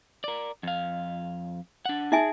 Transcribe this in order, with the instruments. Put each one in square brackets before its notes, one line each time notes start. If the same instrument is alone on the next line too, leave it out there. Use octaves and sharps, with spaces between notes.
[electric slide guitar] A#4 D5
F2 F5
D4 F#5
[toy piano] D#4 E5 G#5 [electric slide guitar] G#4